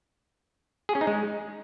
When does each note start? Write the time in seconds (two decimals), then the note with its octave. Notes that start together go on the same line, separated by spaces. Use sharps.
0.89 G#4
0.95 C#4
1.01 D#4
1.07 G#3